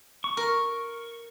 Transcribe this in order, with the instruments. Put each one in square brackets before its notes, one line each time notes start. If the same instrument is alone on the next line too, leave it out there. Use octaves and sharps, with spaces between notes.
[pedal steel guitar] C#6
[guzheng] A#4